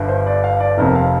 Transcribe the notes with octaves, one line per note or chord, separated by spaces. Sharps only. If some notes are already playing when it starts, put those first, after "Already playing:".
Already playing: G1 G2 D3
C5
D5
F5
D5
F1 F2 C3 A#4
F5